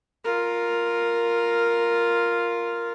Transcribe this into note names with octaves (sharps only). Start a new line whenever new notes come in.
F4 A#4